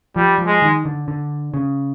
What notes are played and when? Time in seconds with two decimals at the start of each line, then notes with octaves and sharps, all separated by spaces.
0.16 F3 G3
0.38 F3
0.47 G#3
0.62 D#3
0.85 D3
1.08 D3
1.54 C#3